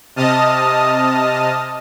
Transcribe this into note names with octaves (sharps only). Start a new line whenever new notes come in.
C3 D#5 A5 D#6 F6